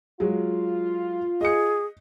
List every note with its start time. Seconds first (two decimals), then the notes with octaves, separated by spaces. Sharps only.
0.20 F#3 G#3 F4
1.41 G#4 D#5 C#7